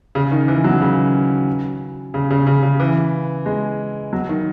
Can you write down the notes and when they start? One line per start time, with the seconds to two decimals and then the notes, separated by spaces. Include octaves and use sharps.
0.15 C#3
0.31 D#3
0.48 E3
0.64 F#3
0.81 C#3
2.14 C#3
2.30 C#3
2.47 C#3
2.62 C#3
2.80 E3
3.46 G#3
4.13 F#3
4.29 D#3